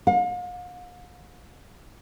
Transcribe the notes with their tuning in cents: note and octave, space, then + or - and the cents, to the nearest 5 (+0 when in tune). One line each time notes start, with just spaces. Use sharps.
F5 +40